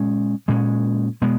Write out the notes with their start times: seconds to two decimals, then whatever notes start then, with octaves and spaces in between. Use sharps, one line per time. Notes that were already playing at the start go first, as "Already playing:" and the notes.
Already playing: A#2 G#3 C#4
0.48 A#2 G#3 C#4
1.21 B2 G#3 B3